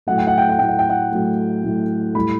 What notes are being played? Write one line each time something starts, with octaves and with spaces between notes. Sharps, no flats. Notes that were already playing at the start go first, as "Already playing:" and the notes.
A2 F#3 A3 F#5
G5
F#5
G5
F#5
A2 F#3 A3 G5
F#5
G5
F#5
A2 F#3 A3
A2 F#3 A3
A2 G3 B5